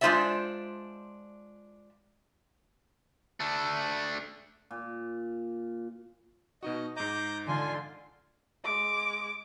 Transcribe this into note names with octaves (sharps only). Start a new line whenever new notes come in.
G#3 D4 F4 C5 D5 E5
A3 D4
A#2
B2 D#4 F#4 D#5
G#2 D#5 A#5 D6 G6
D3 F4 G#5 C6
G#3 D6